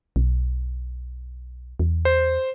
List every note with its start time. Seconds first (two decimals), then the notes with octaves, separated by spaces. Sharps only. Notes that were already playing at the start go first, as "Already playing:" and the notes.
0.16 B1
1.80 E2
2.05 C5